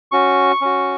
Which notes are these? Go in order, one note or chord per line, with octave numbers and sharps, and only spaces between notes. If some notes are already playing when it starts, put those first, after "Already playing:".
C#4 F#4 C#6
C#4 F#4